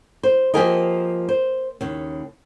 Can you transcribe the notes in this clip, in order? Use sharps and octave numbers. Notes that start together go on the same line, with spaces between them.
C5
F3 A#3 G4 G#4 A#4 D#5
C5
D#2 C#3